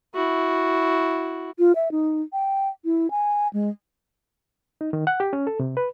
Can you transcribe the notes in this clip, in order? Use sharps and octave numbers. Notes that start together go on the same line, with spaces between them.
E4 F#4
F4
E5
D#4
G5
E4
G#5
G#3
D#4
D#3
F#5
G4
C#4
A4
C3
B4